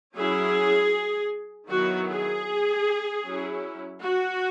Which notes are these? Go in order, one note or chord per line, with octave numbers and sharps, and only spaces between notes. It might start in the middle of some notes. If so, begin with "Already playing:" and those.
F#3 C#4 E4 G#4
D#3 F#3 B3 E4 F#4
G#4
F#3 C#4 E4
F#4